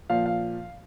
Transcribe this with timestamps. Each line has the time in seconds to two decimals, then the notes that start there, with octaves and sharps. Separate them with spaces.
0.10 A#2 F3 F5
0.26 F5